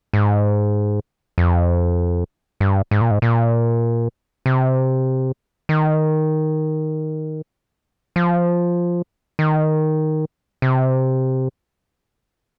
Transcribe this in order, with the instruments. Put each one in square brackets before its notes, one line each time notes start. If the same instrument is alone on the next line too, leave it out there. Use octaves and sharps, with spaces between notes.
[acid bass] G#2
F2
G2
G#2
A#2
G#2
A#2
C3
D#3
F3
D#3
C3